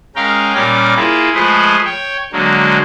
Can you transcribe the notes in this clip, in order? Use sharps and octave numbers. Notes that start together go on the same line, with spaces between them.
G#3 C#4 A#4 F5 G5
A#2 G3 C#4 A#4 D6
A#3 E4 F4 G#4
F3 G#3 A3 G#4 B4 C5
C#5 G5
D3 F#3 G#3 A#3